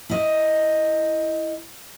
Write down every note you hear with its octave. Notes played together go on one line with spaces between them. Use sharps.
E4 D#5